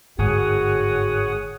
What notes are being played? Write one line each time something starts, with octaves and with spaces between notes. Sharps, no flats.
G1 G#2 F#4 G#4 C#5 F#5 G#5 D#6